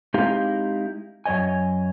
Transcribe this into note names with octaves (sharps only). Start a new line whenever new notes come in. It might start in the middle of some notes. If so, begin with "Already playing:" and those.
G#3 C4 D#4 E4 G4 F5
F#2 B3 C#5 D#5 G#5